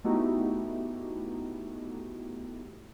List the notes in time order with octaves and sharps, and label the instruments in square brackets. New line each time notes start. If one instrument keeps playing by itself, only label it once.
[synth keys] A3 B3 D#4 E4 F#4 G4